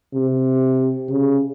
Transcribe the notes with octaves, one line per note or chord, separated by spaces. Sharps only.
C3
C#3